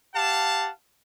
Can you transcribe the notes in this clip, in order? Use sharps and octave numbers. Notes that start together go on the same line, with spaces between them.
G4 F5 F#5 A5